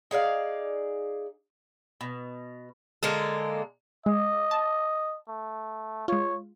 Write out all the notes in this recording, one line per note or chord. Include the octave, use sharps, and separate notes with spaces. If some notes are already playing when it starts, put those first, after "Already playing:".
D#4 G#4 D5 F5
B2
D3 G#3 A#3 A4
G#3 D#5
A5
A3
G#3 F4 C#5